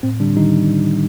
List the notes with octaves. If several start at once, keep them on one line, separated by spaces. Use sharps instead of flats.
A2 C4
D3 G3 D4
D#3 G3 D#4